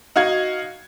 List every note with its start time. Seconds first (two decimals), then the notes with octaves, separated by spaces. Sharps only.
0.16 D#4 F#4 F5 G#6